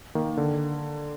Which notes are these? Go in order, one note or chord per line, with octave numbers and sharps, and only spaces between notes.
D#3 A#3
D3